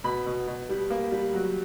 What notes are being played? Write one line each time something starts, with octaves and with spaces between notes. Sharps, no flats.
B2 B5
B2
B2
G3
A#3
G3
F#3